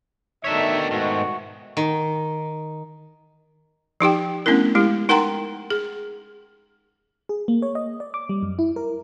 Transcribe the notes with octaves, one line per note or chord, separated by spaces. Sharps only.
B2 D#3 A3 D4 D#4 C#5 E5
G#2 F#4
D#3
F3 D#4 G4 G5
A3 B3 C#4 D4 E4 A#4
G#3 E4 G4
D#4 A#4 F#5 G5 A#5 C6
G#4
G#4
A#3
C#5
D#5
D5
D6
G3
F#2
E4
A#4